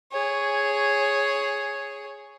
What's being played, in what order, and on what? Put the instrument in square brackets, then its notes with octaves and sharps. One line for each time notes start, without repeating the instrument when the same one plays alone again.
[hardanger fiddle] G#4 C#5